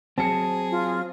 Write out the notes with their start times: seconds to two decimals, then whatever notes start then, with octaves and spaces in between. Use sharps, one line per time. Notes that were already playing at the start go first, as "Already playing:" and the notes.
0.18 F#3 C4 G#4 A5 C#7
0.71 F4